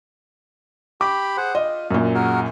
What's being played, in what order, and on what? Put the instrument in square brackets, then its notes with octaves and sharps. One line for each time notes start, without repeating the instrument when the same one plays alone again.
[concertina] G4 B5 [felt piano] D6
[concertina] G#4 C5 F#5
[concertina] F4 [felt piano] D#5
[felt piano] F#2 A#2
[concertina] F#4 G#4 A#4